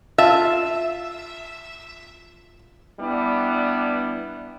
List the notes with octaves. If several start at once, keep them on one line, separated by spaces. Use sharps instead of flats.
F4 E5 A5
G3 B3 D4 E4